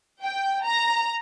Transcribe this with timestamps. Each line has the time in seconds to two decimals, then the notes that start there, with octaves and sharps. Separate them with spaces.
0.23 G5
0.64 A#5